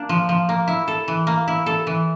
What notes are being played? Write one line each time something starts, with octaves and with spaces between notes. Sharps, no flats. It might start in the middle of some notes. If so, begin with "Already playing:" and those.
Already playing: A#3 D4
F3
F3
A#3
E4
A4
E3
A#3
E4
A4
E3